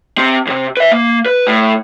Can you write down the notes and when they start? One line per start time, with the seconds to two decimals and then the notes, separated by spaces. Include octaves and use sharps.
0.18 C4 G4
0.47 D#2 C3
0.77 B4 E5
0.92 A#3
1.26 B4
1.47 A2